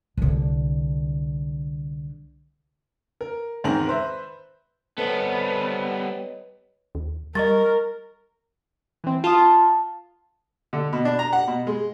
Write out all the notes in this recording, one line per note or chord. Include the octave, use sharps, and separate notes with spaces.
C2 D3
A#4
E2 G#2 D#3 C4 A#5 F#7
B4 C5 E5
C3 G3 B3 A4 B4 C#5 D#5
D#2
G3 A#4 D#5 C#6 A6
E3 C4
F4 A5 D#6
D3
B2
D4
A#5
F#5
B2
G#3